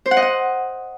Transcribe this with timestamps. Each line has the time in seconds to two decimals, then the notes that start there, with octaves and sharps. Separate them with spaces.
0.06 C5
0.11 F#5
0.17 D#5
0.22 F#5